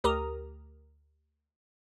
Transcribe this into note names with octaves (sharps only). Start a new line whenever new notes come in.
D2 G4 A#4 A#5 D#6